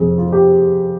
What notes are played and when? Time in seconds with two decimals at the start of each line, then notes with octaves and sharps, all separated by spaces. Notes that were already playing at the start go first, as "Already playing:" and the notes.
Already playing: F1 F2 C3 F3 G#4
0.18 F4
0.32 G4